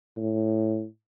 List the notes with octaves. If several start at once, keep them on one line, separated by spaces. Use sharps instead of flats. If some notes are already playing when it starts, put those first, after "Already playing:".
A2